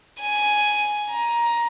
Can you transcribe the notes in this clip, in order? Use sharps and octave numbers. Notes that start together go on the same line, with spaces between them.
G#5
A#5